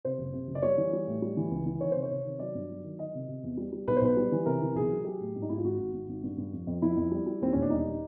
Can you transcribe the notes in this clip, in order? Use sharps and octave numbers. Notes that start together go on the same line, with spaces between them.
C3 C5
F#1
C3
F#1
D5
G3 C#5
E3
G3
A2
G3
E3
C#2
E3
D#3 C#5
C3 C5
C#5
C3
D#3
F#3 D5
G2
F#3
D#3
D#3 D#5
C3
C3
E2
G3
G3
B1 B4
C5
B1 B4
G3
E3
C3 A#4
E3
B1 G#4
F#3
F#3 G4
A2
G#2
D#4
G#2 E4
F4
G#1 F#4
G#1
G#1
G#1
G2
G2
F2
F2
F2 E4
F2
G3
G3
D#2 C4
E1 C#4
D4
G3 D#4